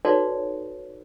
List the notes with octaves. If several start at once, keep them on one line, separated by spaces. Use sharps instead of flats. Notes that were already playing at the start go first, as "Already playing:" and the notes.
D#4 F#4 A4 B4 C#5 D5